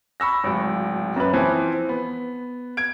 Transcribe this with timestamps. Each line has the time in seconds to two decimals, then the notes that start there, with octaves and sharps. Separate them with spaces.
0.20 B5 C#6 E6 A#6
0.44 D1 G#1
1.16 F#2 B4
1.33 E3 F3 C4
1.89 B3
2.77 G#6 D7